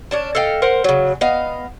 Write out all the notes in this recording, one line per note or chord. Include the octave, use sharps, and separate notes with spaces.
C#4 D4 A5
A4 D#5 F5 G5
A#4 C5 F#5
C#3 F#3
B3 D#5 F5